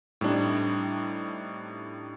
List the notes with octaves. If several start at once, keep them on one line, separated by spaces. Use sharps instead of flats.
A2 G3 C4 D4 D#4